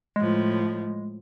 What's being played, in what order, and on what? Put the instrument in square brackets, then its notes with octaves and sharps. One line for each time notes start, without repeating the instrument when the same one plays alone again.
[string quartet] A2 F3 [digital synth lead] G#3